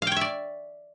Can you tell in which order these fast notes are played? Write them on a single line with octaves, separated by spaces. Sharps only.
F5 G5 C#5 E5 D5